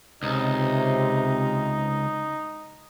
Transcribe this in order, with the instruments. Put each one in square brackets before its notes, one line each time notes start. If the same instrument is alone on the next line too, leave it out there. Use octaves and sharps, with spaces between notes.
[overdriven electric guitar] C#2 [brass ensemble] C3 [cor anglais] D#4